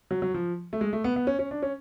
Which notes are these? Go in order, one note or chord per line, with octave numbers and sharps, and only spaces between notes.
F#3
F#3
F3
A3
G#3
A3
B3
B3
C#4
C#4
D4
C#4